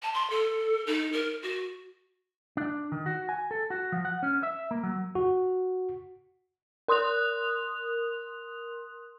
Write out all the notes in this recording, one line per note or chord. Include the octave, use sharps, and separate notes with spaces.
A5
C6
A4
D#4
A#4
F#4
D4
D#3
F#4
G#5
A4
F#4
F3
F#5
C#4
E5
A#3
F#3
F#4
A#4 C6 D#6 F#6 F7